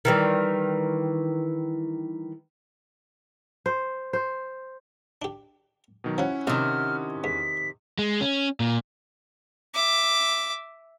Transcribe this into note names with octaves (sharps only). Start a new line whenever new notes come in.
D#3 E3 G3
C5
C5
D4 G4
B2 D#3 F#3
F3 F#3 C#4 E4 F#5
A#1 C3 D#3 F6
E2 B6
G#3
C#4
A#2
E5 D6